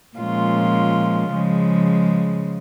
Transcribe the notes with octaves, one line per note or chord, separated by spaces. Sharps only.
A#2 F3 G#3 C#4 F4
C#3 F3 G#3